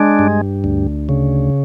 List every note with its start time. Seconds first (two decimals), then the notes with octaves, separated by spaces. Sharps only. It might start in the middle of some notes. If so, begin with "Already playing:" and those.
Already playing: G#3 D4
0.19 G2
0.64 D2
1.09 C#3